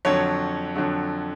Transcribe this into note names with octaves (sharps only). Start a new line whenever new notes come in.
F2 D3 F#3 C#5
F2 D3 F#3